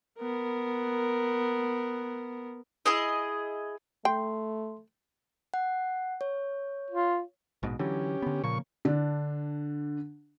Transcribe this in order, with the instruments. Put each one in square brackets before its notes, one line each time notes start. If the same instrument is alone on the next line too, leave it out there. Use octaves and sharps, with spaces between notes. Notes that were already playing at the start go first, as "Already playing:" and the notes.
[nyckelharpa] B3 A#4
[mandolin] E4 G#4 D#5
[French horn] A3 [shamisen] G5 [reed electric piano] C6
[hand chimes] F#5
C#5
[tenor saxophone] F4
[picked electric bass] A#1 G#2 B2
[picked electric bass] D3 E3 F#3 [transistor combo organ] C#4 G4
[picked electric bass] D3 B3
[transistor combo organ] A#2 C#6 [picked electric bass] C#3 F3 A#3
[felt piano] D3 D4